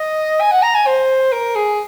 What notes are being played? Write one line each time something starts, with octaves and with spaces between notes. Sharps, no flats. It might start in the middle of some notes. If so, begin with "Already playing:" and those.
Already playing: D#5
G#5
F#5
A#5
G#5
C5
A#4
G#4